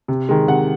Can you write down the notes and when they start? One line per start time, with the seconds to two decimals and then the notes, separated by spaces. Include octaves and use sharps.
0.08 C3
0.29 D#3 G#3
0.48 C3 F#5